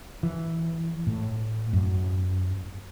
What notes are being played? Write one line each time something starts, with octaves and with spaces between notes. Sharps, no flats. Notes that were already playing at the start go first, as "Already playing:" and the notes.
E3
A2
F#2